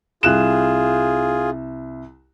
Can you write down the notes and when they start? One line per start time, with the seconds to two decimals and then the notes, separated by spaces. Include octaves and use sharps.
0.23 C2 F4 G#4 F#6 E7